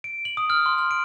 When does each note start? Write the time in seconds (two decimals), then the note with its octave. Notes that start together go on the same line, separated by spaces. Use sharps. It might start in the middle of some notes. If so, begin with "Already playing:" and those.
0.04 D7
0.25 F#7
0.37 D#6
0.50 F6
0.66 C6
0.78 F6
0.91 D7